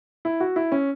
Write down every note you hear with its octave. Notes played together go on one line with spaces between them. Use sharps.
E4
F#4
E4
C#4